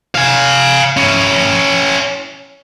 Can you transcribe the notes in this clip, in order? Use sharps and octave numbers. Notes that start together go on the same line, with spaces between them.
F5 G#5
C#4 E4